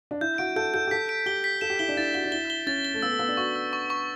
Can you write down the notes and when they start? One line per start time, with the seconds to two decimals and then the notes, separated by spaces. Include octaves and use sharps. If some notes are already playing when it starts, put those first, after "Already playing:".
0.11 D4
0.21 E4 G6
0.38 F#4 D7
0.56 A4 G6
0.74 A4 G6
0.87 G4
0.91 A4 B6
1.09 D7
1.26 G4 G7
1.44 B6
1.61 A4 E7
1.70 G4
1.79 E4 G7
1.88 D4
1.97 E4 A6
2.14 F#4 G7
2.24 D4
2.32 E4 G7
2.50 G7
2.67 C#4 A6
2.85 G7
2.94 A3
3.02 B3 E6
3.11 A3
3.19 B3 E6
3.28 D4
3.37 F#4 C#6
3.56 E6
3.73 C#6
3.90 C#6